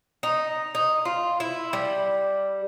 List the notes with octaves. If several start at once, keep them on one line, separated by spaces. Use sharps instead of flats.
D#4
D#4
F4
E4
G3